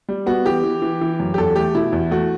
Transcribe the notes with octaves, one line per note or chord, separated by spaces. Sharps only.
G3
B3 F#4
E3 G4
E3
E3
E3
F#2
G4
E2 A4
A3 G4
B2 E4
E2
A3 F#4